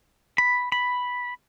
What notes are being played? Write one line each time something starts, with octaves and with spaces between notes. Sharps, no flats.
B5
B5